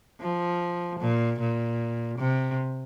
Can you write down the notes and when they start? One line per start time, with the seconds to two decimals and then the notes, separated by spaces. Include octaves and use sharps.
0.21 F3
1.00 A#2
1.40 A#2
2.18 C3